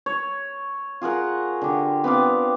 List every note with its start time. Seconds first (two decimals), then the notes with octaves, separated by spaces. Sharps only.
0.06 C#5
1.02 F4 G#4 A#4 F#5
1.61 D3 G4
2.04 B3 C4 D5 F5